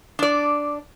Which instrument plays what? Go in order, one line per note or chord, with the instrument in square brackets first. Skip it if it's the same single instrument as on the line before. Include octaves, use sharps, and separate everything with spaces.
[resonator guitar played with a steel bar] D4 D5